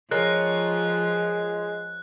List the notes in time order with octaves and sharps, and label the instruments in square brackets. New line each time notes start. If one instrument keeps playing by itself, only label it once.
[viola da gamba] F3 [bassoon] G#3 [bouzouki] F4 A#4 C#5 [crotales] F#6